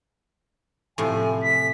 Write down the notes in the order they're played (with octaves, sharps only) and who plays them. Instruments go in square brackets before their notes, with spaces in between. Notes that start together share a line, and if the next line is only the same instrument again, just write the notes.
[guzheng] A2 C3 F3 [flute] G#5
[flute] B6